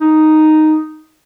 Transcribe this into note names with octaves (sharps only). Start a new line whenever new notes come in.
D#4